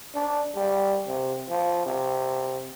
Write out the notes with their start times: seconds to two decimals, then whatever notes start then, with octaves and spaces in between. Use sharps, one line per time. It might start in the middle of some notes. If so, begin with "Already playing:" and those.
0.15 D4
0.56 G3
1.07 C3
1.49 F3
1.86 C3